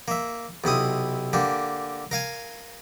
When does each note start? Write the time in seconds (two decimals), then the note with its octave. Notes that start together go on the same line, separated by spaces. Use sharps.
0.08 A#3 E5
0.64 B1 C3 E4 D#6
1.33 D3 A#3 G4
2.11 A#4 F5 G#5